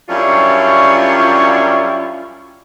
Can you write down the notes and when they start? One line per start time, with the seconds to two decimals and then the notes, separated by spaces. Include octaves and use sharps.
0.09 F#2 G3 C#4 D4 E4 F4